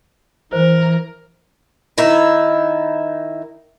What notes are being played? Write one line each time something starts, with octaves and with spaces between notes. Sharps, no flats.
E3 A#4 C5
D#3 E4